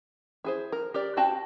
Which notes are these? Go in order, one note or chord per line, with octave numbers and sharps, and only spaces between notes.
E4 G#4 C5
A#4
G4 A#4 D5
C4 F#4 G5 A5